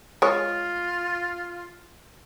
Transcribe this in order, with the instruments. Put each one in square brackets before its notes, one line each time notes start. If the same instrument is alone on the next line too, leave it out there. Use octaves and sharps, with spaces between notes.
[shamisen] G#3 C#5 [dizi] F4